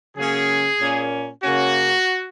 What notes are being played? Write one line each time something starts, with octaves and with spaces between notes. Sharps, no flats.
C#3 F#3 A#3 C#4 G#4
A#2 A#3 C#4
C#3 A#3 C#4 F#4